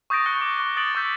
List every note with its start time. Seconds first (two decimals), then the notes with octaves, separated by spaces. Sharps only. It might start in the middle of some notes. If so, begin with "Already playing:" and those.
0.10 C#6 D#6 G6 A6 A#6 D7
0.26 C#6 D#6 F#6 C#7 G7
0.41 D6
0.58 C#6 F#6 G7
0.77 D#6 A6 D7 F#7
0.95 C#6 E6 G6 B6